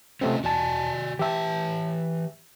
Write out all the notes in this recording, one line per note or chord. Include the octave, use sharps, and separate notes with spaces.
C3 A3 C4 C#4 F4 D#5
E2 F#4 D5 G#5 A5
E3 G4 E5 A5